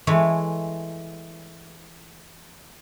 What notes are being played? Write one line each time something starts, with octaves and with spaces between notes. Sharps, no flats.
E3 G#3 A3 B4 C#5